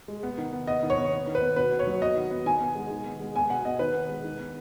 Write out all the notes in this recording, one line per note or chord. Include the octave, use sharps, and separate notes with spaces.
G#3
B3
D#3
B3
B3 D#5
D#3
C#5
B3
B3
D#3
B4
B3
B2 B4
B3
C#5
F#3
B3 D#5
D#3
B3
D#3 G#5
B3
G#3
D#3
B3
G#3
B3 G#5
B2 F#5
B3 D#5
D#3 B4
B3
G#3
D#3
B3